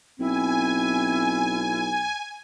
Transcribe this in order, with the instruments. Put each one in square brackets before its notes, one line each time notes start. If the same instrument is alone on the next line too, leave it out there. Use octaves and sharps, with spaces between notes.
[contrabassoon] B1 [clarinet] C4 [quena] E4 [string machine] G#5